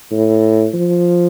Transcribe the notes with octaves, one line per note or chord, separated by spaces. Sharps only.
A2
F3